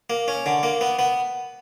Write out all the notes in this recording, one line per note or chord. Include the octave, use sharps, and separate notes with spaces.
A#3
C#4
D3
A#3
B3
B3